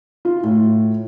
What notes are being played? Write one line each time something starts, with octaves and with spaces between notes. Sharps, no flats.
F4
A2